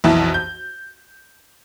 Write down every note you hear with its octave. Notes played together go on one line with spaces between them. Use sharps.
B1 F2 E3 E4 A5
G6